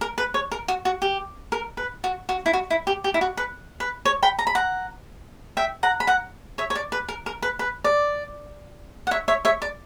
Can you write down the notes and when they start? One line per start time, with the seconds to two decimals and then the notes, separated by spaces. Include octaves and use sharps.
0.01 A#4
0.18 B4
0.34 C#5
0.52 A#4
0.68 F#4
0.85 F#4
1.02 G4
1.52 A#4
1.77 B4
2.04 F#4
2.29 F#4
2.46 E4
2.53 F#4
2.70 E4
2.87 G4
3.04 G4
3.14 E4
3.21 F#4
3.37 B4
3.80 B4
4.05 C#5
4.23 G5 B5
4.39 A#5
4.47 B5
4.55 F#5 A#5
5.57 E5 G5
5.83 F#5 A#5
6.00 B5
6.07 F#5 A#5
6.58 C#5 E5
6.70 C#5
6.75 D5
6.92 B4
7.09 A#4
7.26 A#4
7.42 B4
7.59 B4
7.84 D5
9.07 F#5
9.11 C#5 E5
9.28 C#5 E5
9.45 C#5 E5
9.62 D5